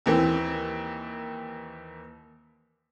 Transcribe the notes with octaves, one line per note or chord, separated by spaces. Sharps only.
D#2 E3 A#3 C4